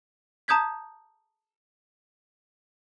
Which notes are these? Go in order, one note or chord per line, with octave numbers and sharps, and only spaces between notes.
A5 A#5 D#6 G6 G#6 B6